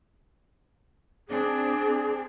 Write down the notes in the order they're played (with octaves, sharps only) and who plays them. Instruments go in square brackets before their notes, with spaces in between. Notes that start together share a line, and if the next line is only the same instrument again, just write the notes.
[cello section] C4 D4 [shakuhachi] G#4